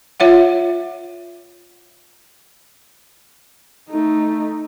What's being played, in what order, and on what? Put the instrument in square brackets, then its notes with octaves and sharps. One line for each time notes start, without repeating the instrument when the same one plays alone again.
[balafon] F4 C#5 E5 F#5
[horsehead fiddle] A3 D#4